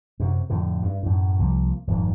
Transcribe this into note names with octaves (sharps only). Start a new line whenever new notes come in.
F#2 C3
F2 A2 D3
G2
F#2 A2
C2 F3 A#3
D#1 F2 G#2